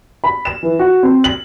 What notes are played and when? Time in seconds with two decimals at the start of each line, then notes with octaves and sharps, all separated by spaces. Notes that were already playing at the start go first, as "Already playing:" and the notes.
0.24 B5
0.45 E7
0.63 E3
0.79 F#4
1.03 C4
1.24 F#7